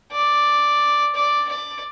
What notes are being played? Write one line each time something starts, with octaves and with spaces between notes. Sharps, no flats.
D5
D5
D5